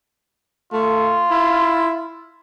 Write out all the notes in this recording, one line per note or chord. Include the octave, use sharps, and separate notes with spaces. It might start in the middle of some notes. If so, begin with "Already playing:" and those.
A3 F4
E4